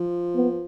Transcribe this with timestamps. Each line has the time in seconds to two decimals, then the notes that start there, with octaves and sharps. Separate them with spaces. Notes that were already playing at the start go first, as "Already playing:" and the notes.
Already playing: F3
0.36 B3